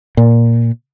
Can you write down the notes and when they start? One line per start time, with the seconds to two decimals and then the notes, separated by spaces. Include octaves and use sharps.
0.17 A#2